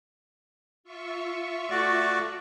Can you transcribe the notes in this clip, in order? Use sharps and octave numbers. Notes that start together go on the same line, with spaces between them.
F4 E5 C#6
A3 F#4 D5